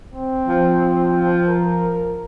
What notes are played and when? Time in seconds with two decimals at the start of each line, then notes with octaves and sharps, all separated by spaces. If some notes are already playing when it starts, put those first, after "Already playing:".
0.14 C4
0.48 F3
1.48 A#4